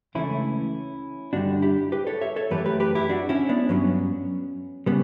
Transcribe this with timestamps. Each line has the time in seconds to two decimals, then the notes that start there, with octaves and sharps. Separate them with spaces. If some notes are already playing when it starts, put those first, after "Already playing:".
0.15 C#2 C#3 E3 A3 C#4 E4
1.33 G2 D3 G3 D4 F#4
1.62 E4 G4
1.92 G4 B4
2.07 A4 C#5
2.21 C#5 E5
2.36 A4 C#5
2.51 F#2 E3 A3 G4 B4
2.66 G4 B4
2.80 G4 B4
2.95 E4 G4
3.09 D4 F#4
3.29 C#4 E4
3.49 B3 D4
3.69 G2 F#3 B3 C#4
4.86 C#3 G3 B3